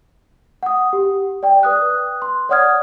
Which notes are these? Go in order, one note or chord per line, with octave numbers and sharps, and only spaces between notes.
F#5 D#6
G4
D5 G5
B4 D#6 F#6
C6
C#5 D5 F#5 D#6 F6 G#6